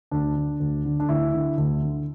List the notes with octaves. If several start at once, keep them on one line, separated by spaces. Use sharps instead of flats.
D2 D4
D3
D2
D3
D4
D2 E4
D3
D2
D3